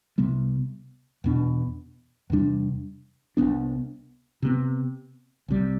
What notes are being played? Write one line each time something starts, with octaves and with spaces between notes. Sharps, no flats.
C2 C3 G3 B3
E2 B2 B3 D4
E2 C3 G3 D4
C2 B2 B3 D4
C3 E3 B3
C2 C3 G3